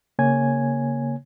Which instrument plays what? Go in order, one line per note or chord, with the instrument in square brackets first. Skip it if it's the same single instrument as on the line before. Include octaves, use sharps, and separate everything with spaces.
[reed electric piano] C#3 A#3 C#5 G#5 G#6